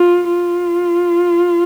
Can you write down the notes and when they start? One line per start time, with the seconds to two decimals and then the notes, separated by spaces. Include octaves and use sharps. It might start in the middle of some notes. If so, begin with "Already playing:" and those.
Already playing: F4
0.34 F4